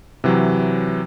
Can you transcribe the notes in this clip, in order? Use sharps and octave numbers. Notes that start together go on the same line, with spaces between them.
C3 E3 F#3